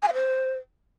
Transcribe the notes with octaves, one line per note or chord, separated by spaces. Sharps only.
G#5
F5
C5